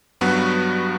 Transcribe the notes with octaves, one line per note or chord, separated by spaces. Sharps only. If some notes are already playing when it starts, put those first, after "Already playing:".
G2 F#3 B3 F#4 B4